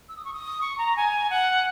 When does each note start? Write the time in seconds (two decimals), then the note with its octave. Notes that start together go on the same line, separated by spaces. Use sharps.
0.09 E6
0.17 D#6
0.25 C#6
0.34 D#6
0.61 C#6
0.78 A#5
0.96 G#5
1.30 F#5